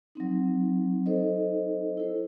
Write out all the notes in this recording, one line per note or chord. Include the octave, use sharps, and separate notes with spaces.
F#3 C4 D#4
D#4 A4 C5 D#5
E4 A4 C5